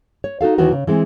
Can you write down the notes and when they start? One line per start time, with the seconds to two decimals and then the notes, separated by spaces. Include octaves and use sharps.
0.24 C#5
0.41 D#4 F#4 A4 F5
0.58 D#2 D#3 E3 F#4 A#4
0.72 C#3
0.87 E3 G#3 C4